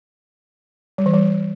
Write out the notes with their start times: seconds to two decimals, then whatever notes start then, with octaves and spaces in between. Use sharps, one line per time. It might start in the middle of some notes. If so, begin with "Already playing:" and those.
0.98 G3
1.06 E3
1.14 G3